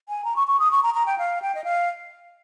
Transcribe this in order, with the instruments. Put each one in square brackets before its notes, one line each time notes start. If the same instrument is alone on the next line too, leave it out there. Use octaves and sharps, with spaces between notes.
[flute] G#5
A#5
C#6
C#6
D#6
C#6
A#5
A#5
G5
F5
G5
D#5
F5